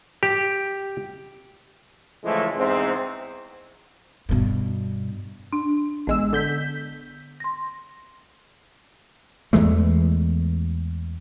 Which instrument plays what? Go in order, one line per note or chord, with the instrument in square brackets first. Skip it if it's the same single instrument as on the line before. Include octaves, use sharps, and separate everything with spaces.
[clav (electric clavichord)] G4
[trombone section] C#2 E3 F3 G#3 A3 E4
E2 G#2 C4
[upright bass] G2 B2
[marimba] D4
[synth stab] A1 G#3 E6 [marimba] B3
[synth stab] D3 G6 B6
[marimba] C6 A#6
[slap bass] E2 E3 G#3 A3